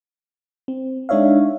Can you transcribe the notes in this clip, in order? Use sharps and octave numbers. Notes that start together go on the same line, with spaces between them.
C4
G#3 D4 D#4 C#5 E5 F5